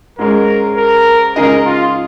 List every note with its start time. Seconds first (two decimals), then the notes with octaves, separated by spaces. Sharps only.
0.19 G#2 G#3 C#4 A#4
0.77 A#4
1.36 C#3 G#3 D#4 G#4 A#4 D#5
1.65 F4